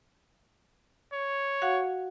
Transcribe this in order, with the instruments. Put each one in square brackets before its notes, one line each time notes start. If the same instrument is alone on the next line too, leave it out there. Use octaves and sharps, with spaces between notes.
[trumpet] C#5
[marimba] F#4 F5 F#5